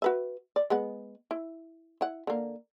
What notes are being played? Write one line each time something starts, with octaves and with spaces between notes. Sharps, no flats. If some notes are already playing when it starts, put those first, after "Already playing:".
F#4 B4 E5
D5
G#3 B3 F#5
E4
E4 F#5
D3 A#3